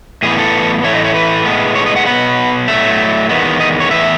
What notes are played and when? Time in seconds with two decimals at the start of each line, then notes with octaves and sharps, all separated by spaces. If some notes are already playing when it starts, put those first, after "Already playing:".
0.23 A2 E3 B3 G#4
0.38 A4
0.84 A2 E3 A3 C#5
0.95 D#5
1.05 C#5
1.14 B4
1.45 A2 G#3 B3
1.76 C#5
1.86 D#5
1.96 F#5
2.06 B2 F#3 B3 F#5
2.68 A2 F#3 A3 E5
3.29 E2 D#3 G#3 B3
3.60 D#5
3.80 C#5
3.90 A2 E3 B3 E5